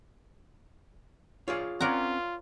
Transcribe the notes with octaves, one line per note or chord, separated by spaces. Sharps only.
F4 G#4 C#5 D5 F5
C4 C#4 F4 A#4 C#5 D5 F#5 A#5